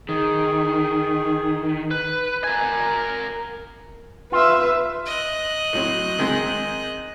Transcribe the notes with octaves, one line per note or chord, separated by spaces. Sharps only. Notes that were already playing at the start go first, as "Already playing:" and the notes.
D#3 G#4
B4
A#4 G#5
F4 B4 E5
D#5 F#6
A2 F#3 C4
D#3 G#3 C4